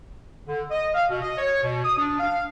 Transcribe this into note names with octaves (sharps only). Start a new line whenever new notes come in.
D3
D#5
F5
B2
D#5
C#5
B2
D#6
D4
F5